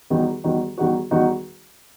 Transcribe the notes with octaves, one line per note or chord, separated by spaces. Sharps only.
E2 D#3 G3 D#4 F#4
E2 D#3 G3 D#4 F#4
E2 D#3 G3 D#4 F#4
E2 D#3 G3 D#4 F#4